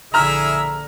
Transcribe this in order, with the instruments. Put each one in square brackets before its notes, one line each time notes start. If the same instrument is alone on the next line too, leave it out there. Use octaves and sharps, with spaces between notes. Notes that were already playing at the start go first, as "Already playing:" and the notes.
[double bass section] A#1 D3 [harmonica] E4 G#4 E5 [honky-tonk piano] A#5 F6